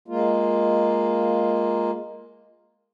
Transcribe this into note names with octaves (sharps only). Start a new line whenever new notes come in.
G#3 A#3 F4